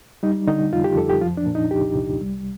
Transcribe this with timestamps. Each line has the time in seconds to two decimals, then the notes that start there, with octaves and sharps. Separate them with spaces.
0.23 G3 D#4
0.47 D3 D#4
0.72 F2 F4
0.84 G4
0.97 F2 A4
1.09 G4
1.21 F3 F4
1.37 D4
1.46 A#2
1.55 D#4
1.71 C2 G4
1.95 C2
2.21 G3